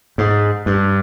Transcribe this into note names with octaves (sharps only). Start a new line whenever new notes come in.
G#2
G2